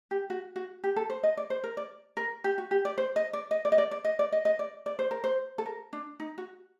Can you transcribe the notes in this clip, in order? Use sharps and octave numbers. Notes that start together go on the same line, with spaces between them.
G4
F#4
F#4
G4
A4
C5
D#5
D5
C5
A#4
D5
A#4
G4
F#4
G4
D5
C5
D#5
D5
D#5
D5
D#5
D5
D5
D#5
D5
D#5
D#5
D5
D5
C5
A#4
C5
A4
A#4
D4
D#4
F#4